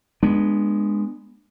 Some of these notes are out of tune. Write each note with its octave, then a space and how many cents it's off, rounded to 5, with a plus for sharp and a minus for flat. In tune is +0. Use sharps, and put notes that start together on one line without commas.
G#3 +0 B3 -15 D4 +25